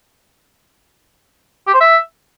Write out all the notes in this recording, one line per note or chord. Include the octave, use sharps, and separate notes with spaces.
G4
C5
E5